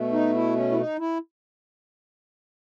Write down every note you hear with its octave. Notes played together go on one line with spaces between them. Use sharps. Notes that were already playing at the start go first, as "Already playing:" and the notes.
Already playing: B2 A3
D#4
E4
C#4
E4
D#4
E4